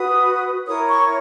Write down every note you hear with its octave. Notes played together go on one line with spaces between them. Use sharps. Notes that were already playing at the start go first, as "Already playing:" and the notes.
Already playing: F#4 B4 D#6
E4 A#4 C#5 D#6
C#6